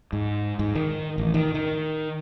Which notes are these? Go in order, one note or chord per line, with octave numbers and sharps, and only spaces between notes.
G#2
G#2
D#3
A1
D#3
D#3